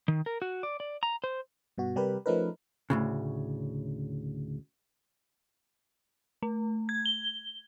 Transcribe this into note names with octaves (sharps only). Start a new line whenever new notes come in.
D#3
A#4
F#4
D5
D5
A#5
C5
G2 B2 F#4
C3 G3 G4 A#4 B4
F3 A3 C#4 D#4 A#4 B4
D2 A2 C#3
A3
G#6
G7